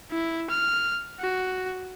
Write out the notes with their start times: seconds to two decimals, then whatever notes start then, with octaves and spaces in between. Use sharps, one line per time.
0.11 E4
0.50 F6
1.20 F#4